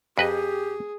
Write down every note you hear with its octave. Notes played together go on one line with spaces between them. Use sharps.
F2 G4 G#4 B4 D#5